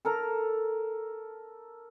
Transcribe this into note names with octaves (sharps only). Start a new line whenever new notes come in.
A4 A#4 A#5